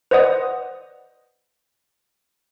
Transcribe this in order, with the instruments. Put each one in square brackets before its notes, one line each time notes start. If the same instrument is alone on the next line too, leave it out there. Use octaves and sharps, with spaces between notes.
[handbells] B4 C5 D5 D#5 F#5 D#6